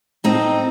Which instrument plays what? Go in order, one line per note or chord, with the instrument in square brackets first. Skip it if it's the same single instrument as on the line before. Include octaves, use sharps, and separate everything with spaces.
[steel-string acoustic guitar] A2 C4 D#4